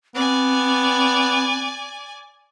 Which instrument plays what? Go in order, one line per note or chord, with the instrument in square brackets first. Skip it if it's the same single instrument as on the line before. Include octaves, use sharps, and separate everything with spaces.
[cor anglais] B3 [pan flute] C4 [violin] D5 G#5